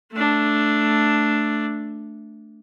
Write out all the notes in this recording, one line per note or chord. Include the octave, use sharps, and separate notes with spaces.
A3 D4